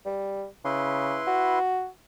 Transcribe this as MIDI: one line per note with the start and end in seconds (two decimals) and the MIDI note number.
0.06 0.46 55
0.65 1.21 49
0.65 1.59 64
0.65 1.59 71
0.65 1.59 84
1.27 1.88 66